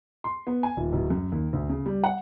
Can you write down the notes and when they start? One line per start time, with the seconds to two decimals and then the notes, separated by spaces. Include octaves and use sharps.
0.24 C6
0.47 B3
0.63 G#5
0.77 D#1
0.93 D1
1.10 F#2
1.32 D#2
1.53 D2
1.69 C#3
1.86 G3
2.04 F#5